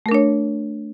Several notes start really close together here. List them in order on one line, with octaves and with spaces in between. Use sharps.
A3 A#4 D4 C#5